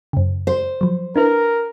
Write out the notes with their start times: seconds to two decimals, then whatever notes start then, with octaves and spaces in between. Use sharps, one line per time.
0.13 F#2 C#3
0.47 C5
0.81 F3 F#3
1.16 D4 E4 A#4 B4